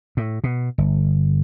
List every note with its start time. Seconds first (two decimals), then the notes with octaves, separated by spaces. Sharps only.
0.17 A2
0.44 B2
0.78 G1